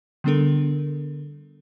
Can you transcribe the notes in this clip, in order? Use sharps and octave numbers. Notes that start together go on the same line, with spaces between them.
D3 G3 B3 D4 A4 A#4